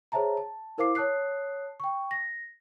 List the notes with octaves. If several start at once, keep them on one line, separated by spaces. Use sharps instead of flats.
G#4 C5 C#5 E5 A5 A#5
A5
E4 A#4 C5 F5 D6 C7
C#5 A5 D#6 F#6 C7
G5 C#6
A#6